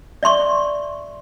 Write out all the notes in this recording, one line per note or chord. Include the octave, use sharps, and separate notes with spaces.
D5 E5 C6 C#6